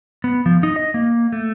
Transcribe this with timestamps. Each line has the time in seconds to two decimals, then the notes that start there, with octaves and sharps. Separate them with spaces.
0.24 B3
0.46 F3
0.63 D#4
0.76 D#5
0.94 A#3
1.32 A3